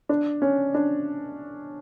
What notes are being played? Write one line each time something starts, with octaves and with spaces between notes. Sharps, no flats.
D4
C#4
D4